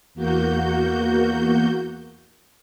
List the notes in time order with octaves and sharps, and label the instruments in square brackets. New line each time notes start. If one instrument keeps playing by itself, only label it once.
[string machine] E2 A#3 F#4 G6